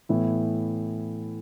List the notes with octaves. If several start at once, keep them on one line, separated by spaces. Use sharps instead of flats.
A2 E3 B3 E4